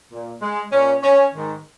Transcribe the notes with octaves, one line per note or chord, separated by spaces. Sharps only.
A#2
G#3
A#2 C#4
C#4
G#2 D#3